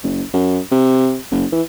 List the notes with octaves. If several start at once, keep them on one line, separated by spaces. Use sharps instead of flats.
F#1
F#2
C3
F#1
E3